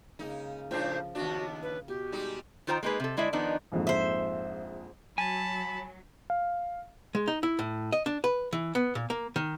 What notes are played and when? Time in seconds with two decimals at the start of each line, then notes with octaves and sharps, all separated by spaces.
0.19 C#3 G#3 A#3 D#4
0.71 A2 C#3 F3 D4 C5
1.15 D#2 B3 D4 F#4
1.63 B4
1.88 B2 G4
2.12 G3 G#3 D#4
2.67 D#3 D#4 F4 C5 G5 A#5
2.83 G#3 A#3 D#4 G#4 B4
3.00 C3 A4
3.17 D3 G#3 E4 D5 E5
3.33 D#3 F3 B3 D4 D#4
3.72 A#1 F2 G#2
3.87 C5 E5
5.18 F#3 G#5 A5 B5
6.30 F5
7.15 G#3
7.28 D#4
7.43 E4
7.59 A2
7.92 D#5
8.06 D4
8.24 B4
8.53 E3
8.75 B3
8.95 A#2
9.10 A#3
9.36 D#3